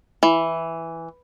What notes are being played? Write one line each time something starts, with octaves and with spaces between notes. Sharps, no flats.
E3